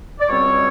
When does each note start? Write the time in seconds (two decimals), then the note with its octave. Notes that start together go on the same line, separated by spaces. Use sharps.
0.20 D5
0.29 C#2 B2 G3 C4 C#5